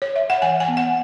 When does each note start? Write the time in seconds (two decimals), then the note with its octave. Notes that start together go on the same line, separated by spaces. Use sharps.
0.02 C#5
0.16 E5
0.30 F#5
0.42 E3 G#5
0.60 G#5
0.68 B3
0.77 F#5